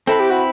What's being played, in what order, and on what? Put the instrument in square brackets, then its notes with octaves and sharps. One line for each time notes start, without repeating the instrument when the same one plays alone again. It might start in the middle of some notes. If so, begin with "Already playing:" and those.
[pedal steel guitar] C4 E4 B4 [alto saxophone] A4
[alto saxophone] G4
F#4